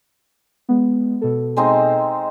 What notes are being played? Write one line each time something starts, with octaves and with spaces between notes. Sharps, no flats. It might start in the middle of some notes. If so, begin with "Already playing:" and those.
G#3 B3
B2 A4
G#3 C4 D#4